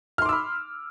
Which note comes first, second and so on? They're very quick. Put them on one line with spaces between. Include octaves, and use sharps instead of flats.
F6 C6 D6 E6 B5